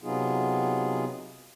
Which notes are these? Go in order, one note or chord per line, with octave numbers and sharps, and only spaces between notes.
C3 F#3 B3 D#4 F4 G#4